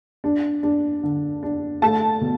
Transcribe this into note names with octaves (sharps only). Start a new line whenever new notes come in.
D4
D4
D3
D4
A3 A5
B2